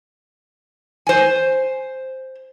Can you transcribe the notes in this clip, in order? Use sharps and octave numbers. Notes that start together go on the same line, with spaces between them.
C5 G#5